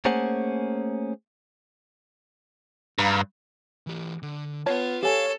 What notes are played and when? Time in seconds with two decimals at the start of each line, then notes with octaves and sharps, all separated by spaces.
0.05 A3 A#3 C#4 G#4 C5 F#5
2.99 G2 F5 A#5 B5
3.87 E3 G4
4.23 D3
4.66 B3 F4 C#5 A5
5.03 G4 A4 C#5 F5 G#5